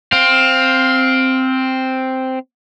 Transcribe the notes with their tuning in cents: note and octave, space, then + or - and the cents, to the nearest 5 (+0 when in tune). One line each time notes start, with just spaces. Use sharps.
C4 +0 F5 +15